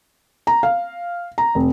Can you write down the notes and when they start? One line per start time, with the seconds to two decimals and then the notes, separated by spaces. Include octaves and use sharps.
0.47 A#5
0.63 F5
1.38 A#5
1.55 F1